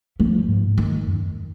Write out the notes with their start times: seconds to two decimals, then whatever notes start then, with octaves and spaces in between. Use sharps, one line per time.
0.20 F3
0.48 G#2
0.78 D#3
1.07 F#2